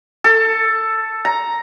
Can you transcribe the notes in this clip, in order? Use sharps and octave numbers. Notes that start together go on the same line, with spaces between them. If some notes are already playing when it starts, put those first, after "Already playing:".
A4
A#5